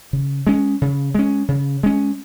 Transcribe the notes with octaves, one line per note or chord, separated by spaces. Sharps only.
C#3
G#3 C#4
C#3
G#3 C#4
C#3
G#3 C#4